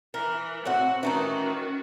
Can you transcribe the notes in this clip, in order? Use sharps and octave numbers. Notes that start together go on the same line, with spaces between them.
E3 A#4
A2 C4 F#4 F#5
D#3 E3 A3 C#4 D#4 F#4